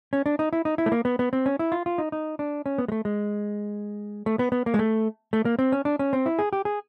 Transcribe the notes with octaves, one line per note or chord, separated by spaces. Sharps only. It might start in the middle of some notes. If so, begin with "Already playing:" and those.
C#4
D4
D#4
E4
D#4
E4
A3
A#3
B3
B3
C4
C#4
E4
F4
F4
D#4
D#4
D4
C#4
B3
G#3
A3
G#3
A3
B3
B3
A#3
G#3
A3
A3
A#3
C4
C#4
D4
C#4
C4
E4
G#4
G4
G#4